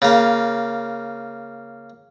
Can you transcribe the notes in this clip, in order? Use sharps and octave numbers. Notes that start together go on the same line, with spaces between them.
C#3 A#3